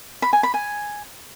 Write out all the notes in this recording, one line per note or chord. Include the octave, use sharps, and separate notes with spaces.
B5
G#5
B5
G#5